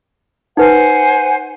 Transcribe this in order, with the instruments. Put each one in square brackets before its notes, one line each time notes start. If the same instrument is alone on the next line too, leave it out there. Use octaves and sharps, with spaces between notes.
[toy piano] D#4 B4 [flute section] C5 F#5 G#5